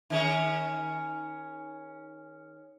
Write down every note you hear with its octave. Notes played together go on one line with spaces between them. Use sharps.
D#3 C#4 G#4